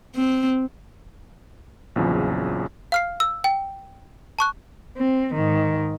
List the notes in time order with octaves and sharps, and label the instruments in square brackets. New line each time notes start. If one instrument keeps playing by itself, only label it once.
[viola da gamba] C4
[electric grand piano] A#1 E2 C#3 F3 F#3
[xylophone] F5 F6 C7
E6
G5
A5 C#6 F#6
[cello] C4
G#2 D#3